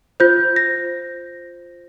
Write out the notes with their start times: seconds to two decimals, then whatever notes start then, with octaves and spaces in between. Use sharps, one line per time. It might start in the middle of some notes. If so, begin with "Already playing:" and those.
0.20 F4 C5 G6
0.56 A#6